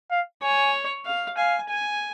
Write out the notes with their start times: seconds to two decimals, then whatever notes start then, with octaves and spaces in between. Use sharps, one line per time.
0.11 F5
0.42 C#5 G#5
1.05 F5
1.37 F5 G#5
1.69 G#5